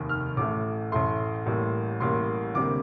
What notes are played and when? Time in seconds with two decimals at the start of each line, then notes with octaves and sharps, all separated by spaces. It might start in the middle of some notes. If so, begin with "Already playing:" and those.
Already playing: F1 D#2 D#3
0.09 F6
0.37 A1 A2 A3 D6
0.92 A1 A2 A3 C6
1.46 A1 A2 G3 A#3
2.00 A1 A2 G3 A#3 C6
2.55 D2 C3 G3 A#3 D6